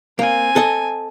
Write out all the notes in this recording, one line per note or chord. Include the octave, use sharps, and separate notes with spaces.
A#3 C4 G#5
A4 D#5